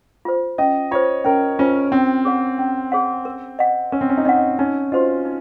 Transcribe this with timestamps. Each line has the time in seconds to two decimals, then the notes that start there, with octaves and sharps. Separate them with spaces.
0.25 F4 C5
0.58 C#4 D#5
0.91 F4 C5 C#5
1.25 C#4 A#4
1.59 C#4 F4 C5
1.92 C4 C#4
2.25 G#4 C#5 F#5
2.58 C#4
2.92 G#4 C#5 F#5
3.25 A#4
3.59 D#5 F#5
3.92 C#4 A#4
4.01 C4
4.10 C#4
4.17 D#4
4.25 C#4 D#5 F#5
4.59 C#4 D#4
4.92 F4 F#4 C5 D#5
5.25 D#4